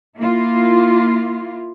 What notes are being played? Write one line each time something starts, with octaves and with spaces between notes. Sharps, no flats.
A#3 E4 F4